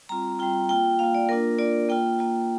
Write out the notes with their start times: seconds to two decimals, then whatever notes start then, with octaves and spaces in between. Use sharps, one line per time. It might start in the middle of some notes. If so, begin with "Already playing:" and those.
0.09 G3 C4 F4 A#5
0.39 G3 C4 F4 G5
0.69 A#3 F4 G5
0.99 A#3 F4 F5
1.15 D5
1.29 A#3 D4 F4 A#4
1.59 A#3 D4 F4 D5
1.89 A#3 F4 G5
2.19 A#3 F4